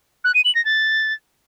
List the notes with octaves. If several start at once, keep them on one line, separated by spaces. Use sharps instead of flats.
F#6
D#7
F#7
A#6
A6